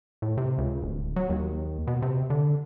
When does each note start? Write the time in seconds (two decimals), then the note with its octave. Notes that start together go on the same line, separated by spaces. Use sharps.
0.22 A2
0.38 C3
0.58 C#2
0.82 D1
1.16 F#3
1.30 D#2
1.87 B2
2.02 C3
2.30 D3